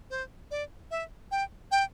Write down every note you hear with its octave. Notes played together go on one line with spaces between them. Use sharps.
C5
D5
E5
G5
G5